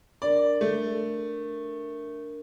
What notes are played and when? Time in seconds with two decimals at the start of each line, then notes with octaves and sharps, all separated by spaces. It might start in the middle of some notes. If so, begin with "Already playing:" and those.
0.22 D4 A#4 D5
0.61 A3